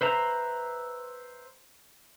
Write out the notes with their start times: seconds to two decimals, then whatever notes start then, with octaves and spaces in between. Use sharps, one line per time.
0.01 B4 C5 E5 A#5